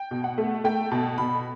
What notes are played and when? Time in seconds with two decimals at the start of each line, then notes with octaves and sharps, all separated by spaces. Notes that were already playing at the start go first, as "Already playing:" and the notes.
Already playing: G5
0.11 B2
0.24 F#5
0.38 A3
0.64 A3 G5
0.92 B2 A5
1.18 B2 B5